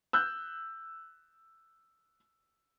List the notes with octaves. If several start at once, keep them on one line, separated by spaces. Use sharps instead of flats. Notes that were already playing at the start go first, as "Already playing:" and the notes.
E6 F#6 G6